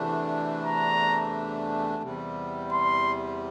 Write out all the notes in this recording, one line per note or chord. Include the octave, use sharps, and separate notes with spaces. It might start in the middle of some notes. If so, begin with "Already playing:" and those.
Already playing: E2 C3 E3 A3 D4
A#5
E2 C3 G3
C6